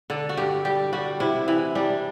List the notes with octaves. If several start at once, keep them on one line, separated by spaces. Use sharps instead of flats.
D3 A4
F#4
G2 G4
G3 G4
G3 F#4
C3 E4
E3
G3 D4